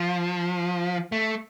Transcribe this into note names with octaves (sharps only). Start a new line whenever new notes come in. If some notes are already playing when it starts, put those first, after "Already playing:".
Already playing: F3
A3